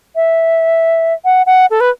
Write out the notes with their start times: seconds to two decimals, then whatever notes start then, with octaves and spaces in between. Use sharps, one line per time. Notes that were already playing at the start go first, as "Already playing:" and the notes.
0.16 E5
1.25 F#5
1.46 F#5
1.70 A4
1.80 B4